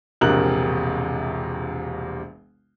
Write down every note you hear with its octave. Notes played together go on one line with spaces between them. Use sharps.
E1 A#1 C3 A#4 F#6 F#7